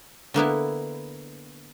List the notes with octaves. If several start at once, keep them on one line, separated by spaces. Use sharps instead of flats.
D3 A#3 B3 E4